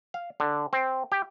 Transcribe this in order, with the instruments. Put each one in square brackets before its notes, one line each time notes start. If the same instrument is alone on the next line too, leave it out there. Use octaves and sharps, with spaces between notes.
[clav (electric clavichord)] F5
D3
C4
G4